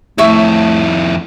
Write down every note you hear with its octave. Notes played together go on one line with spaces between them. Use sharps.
F2 A3 E4 C#5 E5 C#6